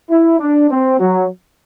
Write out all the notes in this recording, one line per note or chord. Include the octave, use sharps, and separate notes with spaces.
E4
D4
C4
F#3